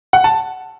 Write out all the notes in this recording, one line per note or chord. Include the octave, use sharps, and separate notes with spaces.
F#5
A5